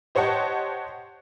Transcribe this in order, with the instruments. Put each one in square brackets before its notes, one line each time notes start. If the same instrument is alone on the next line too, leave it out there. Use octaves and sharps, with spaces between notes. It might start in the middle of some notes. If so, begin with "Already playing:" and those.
[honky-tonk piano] G4 C5 C#5 D#5 F#5 A5